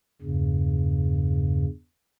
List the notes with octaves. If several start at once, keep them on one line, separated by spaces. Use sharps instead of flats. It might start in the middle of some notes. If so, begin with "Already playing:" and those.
E2 G2 C#3